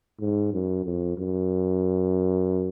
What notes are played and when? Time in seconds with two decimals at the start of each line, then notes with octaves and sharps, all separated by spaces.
0.20 G#2
0.53 F#2
0.85 F2
1.18 F#2